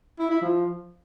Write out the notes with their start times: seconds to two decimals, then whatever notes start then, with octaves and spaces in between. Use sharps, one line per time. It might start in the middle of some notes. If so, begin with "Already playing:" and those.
0.19 E4
0.30 E4
0.42 F3